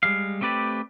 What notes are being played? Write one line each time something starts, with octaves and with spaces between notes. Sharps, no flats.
G3 G#3 F5
A3 C4 G4 B4 D5